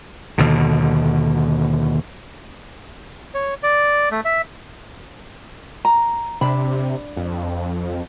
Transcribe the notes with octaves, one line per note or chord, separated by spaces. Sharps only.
D#2 B2 D3
C#5
D5
A3
E5
A#5
C3 D4 B5
F2